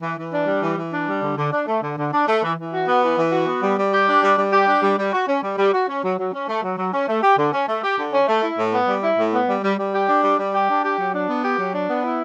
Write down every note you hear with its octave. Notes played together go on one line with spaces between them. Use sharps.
E3
E3
D4
G3
E3
E3
D4
G3
D3
D3
D4
A3
D3
D3
D4
A3
E3
E3
F#4
B3
E3
E3
F#4
B3
G3
G3
G4
D4
G3
G3
G4
D4
G3
G3
F#4
C#4
G3
G3
F#4
C#4
F#3
F#3
C#4
A3
F#3
F#3
C#4
A3
G4
D3
C#4
A3
G4
D3
C#4
A3
E4
A2
B3
G3
E4
A2
B3
G3
G3
G3
G4
D4
G3
G3
G4
D4
G4
F#3
D4
B3
G4
F#3
D4
B3
E4